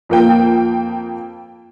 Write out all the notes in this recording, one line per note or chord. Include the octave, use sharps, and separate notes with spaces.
F2 A#3 G5